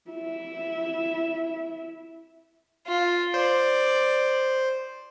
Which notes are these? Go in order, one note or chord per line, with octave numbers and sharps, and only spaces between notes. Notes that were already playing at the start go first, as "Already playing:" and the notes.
E4 E5
F4
C5 D5